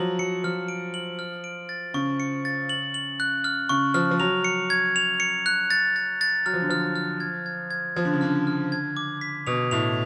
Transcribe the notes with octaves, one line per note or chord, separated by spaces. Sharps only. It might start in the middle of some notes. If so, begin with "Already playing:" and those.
Already playing: F3 F#3 F#7
F#3 C#7
F3 F6
D7
F#7
F6
D7
A6
C#3 C#6
C#7
A6
F#7
F#7
F#6
F6
C#3 C#6
F3 F6
F3
F#3 F7
C#7
G#6
F7
C#7
F#6
A6
A6
A6
F#3 F6
F3
D3
F3 F6
F6
G#6
G#6
G#6
F3 G#6
D3
C#3
D3 F6
F6
G#6
D6
B6
B2 F7
A2 F7